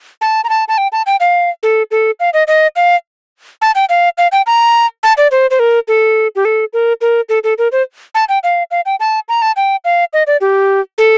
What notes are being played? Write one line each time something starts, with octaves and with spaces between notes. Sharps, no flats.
A5
A#5
A5
A5
G5
A5
G5
F5
A4
A4
F5
D#5
D#5
F5
A5
G5
F5
F5
G5
A#5
A5
D5
C5
C5
A#4
A4
G4
A4
A#4
A#4
A4
A4
A#4
C5
A5
G5
F5
F5
G5
A5
A#5
A5
G5
F5
D#5
D5
G4
A4